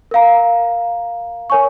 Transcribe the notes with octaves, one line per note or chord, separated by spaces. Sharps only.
A#4 F5 A#5
A#4 C#5 G#5 C#6